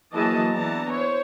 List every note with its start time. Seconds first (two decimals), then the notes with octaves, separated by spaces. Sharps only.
0.13 E3 F#3 A#3 G#4 D#5 A5
0.51 E3 B3 D4 A5 A#5
0.91 C5 C#5